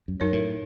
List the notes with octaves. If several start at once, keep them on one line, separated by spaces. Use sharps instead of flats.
F#2
F#2 D#4 A#4 C#5
A2